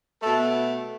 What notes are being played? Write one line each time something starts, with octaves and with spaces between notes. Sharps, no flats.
B2 A3 A4